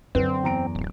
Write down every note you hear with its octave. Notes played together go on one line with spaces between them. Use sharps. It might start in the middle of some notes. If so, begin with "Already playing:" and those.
F#2 D3 C4 B4
E2 A#5 D7
D1